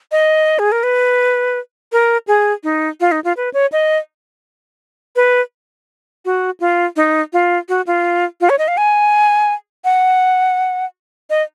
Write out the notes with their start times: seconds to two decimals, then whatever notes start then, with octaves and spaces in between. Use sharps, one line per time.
0.12 D#5
0.59 G#4
0.72 A#4
0.83 B4
1.92 A#4
2.27 G#4
2.64 D#4
3.00 F4
3.12 D#4
3.24 F4
3.37 B4
3.54 C#5
3.72 D#5
5.16 B4
6.25 F#4
6.60 F4
6.96 D#4
7.33 F4
7.69 F#4
7.87 F4
8.41 F4
8.50 C#5
8.59 D#5
8.68 F5
8.77 G#5
9.85 F#5
11.30 D#5